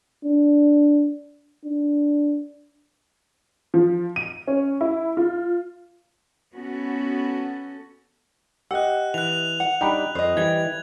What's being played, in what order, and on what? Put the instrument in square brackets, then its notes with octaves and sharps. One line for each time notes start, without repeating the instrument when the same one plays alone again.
[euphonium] D4
D4
[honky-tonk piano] F3
D#7
C#4
E4
F4
[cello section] B3 C#4 F#4 A4
[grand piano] G4 D#5 [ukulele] F#5 [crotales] E6 F#6
[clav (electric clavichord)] E3 [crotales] F#6 F7
[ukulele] F#5
[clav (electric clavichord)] G3 D#4 [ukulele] D4 [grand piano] G5 A#5 B5
[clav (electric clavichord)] F2 [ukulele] C5 D#5
[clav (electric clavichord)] E3 G3 [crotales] G#6